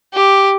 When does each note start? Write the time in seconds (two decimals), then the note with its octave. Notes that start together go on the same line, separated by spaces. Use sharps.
0.14 G4